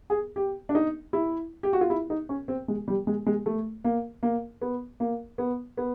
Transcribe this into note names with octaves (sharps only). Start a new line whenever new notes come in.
G#4
G4
D4
D#4
E4
G4
F#4
F4
E4
D#4
C#4
C4
G#3
G3
G#3
G#3
A3
A#3
A#3
B3
A#3
B3
B3